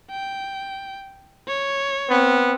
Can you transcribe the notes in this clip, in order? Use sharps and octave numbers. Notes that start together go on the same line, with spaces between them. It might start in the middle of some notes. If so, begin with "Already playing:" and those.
G5
C#5
B3 C4